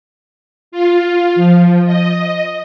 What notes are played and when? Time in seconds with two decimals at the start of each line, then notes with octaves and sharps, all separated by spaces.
0.72 F4
1.35 F3
1.86 D#5